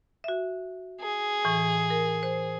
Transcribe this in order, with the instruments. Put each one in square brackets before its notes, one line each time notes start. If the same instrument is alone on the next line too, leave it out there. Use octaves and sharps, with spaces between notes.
[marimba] F#4 E5
[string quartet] G#4
[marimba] A2 E3
A#4
C5